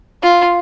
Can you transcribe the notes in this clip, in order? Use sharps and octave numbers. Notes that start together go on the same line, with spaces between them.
F4